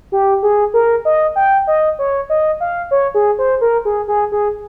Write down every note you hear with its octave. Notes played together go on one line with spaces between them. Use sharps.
G4
G#4
A#4
D#5
G5
D#5
C#5
D#5
F5
C#5
G#4
C5
A#4
G#4
G#4
G#4